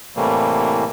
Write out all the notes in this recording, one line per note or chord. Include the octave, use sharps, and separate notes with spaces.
A2 C3 E3 G3 A3 A#3